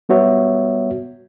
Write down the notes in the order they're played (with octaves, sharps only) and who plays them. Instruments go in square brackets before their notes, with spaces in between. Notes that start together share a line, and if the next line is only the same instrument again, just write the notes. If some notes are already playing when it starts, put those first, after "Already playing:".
[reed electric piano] G3 B3 F#4 C#5 E5